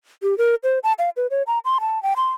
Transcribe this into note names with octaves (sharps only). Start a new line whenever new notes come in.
G4
A#4
C5
A5
F5
B4
C#5
A#5
C6
A5
G5
C6